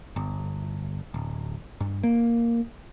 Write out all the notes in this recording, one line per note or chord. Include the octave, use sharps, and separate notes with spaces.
G1
D1
G2
A#3